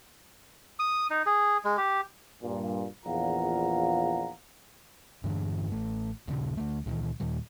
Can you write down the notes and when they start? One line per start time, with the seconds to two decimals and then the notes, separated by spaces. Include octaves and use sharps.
0.79 D#6
1.10 D#4
1.26 G#4
1.64 G#3
1.77 G4
2.42 G2 A#2
3.06 A#1 E2 F4 F5 F#5 A#5
5.24 G2 D3 E3 D4
5.72 A1 A3
6.28 D#1 C#3
6.57 D2 A3
6.86 C#2 A#2 D#3 E3
7.20 D#2 A#2 D#3 G3